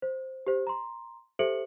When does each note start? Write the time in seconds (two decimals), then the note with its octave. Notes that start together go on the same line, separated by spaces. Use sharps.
0.02 C5
0.47 G4 C5
0.67 A#5 C6
1.39 G4 A4 C5 E5 C#7 F#7